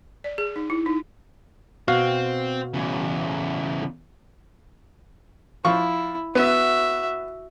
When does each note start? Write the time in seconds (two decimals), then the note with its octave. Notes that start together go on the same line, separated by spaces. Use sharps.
0.24 D5
0.38 G#4
0.56 D#4
0.70 E4
0.86 D#4
1.88 B2 C4 F#4 F5
2.74 E2 C#3
5.65 F3 E4 C#6
6.35 B3 F#4 E5